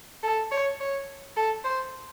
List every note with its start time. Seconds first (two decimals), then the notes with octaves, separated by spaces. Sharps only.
0.23 A4
0.51 C#5
0.80 C#5
1.36 A4
1.64 C5